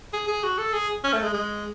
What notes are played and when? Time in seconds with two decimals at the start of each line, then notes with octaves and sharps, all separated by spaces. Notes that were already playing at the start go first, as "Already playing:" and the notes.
0.13 G#4
0.28 G#4
0.43 F#4
0.58 A4
0.73 G#4
1.04 C#4
1.13 A3
1.23 G#3
1.34 G#3